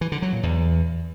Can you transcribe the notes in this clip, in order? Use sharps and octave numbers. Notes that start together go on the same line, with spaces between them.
E3
D3
F#3
A#2
E2